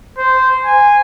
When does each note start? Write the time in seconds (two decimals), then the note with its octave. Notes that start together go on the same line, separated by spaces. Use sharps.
0.18 C5
0.65 G#5